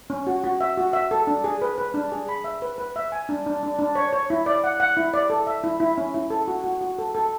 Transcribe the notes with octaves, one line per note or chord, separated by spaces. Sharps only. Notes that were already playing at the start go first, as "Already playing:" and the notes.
C#4
F#4
F#4
E5
F#4
E5
A4
D4
G#4
B4
B4
D4
G#4
B5
E5
B4
B4
E5
G#5
D4
D4
D4
D4
C#5
C#5
E4
D5
F#5
F#5
E4
D5
A4
E5
E4
E4
C#4
E4
A4
F#4
F#4
F#4
A4
A4